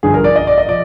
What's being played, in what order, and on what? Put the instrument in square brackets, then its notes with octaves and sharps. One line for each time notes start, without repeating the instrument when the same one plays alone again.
[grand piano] G2 D3 F3 G#4
A#4
D5
D#5
D5
D#5
F3 D5